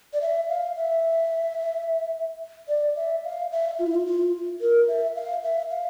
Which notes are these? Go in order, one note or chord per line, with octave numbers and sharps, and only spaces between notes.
D5
E5
F5
E5
D5
E5
F5
E5
F4
E4
F4
F4
A#4
E5
F5
E5
F5